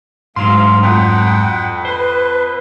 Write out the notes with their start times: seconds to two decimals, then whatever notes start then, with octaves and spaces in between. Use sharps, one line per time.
0.36 D2 G#2 F#3 G#3 F5 C6
0.83 F2 F#5 G5
1.85 B4 C5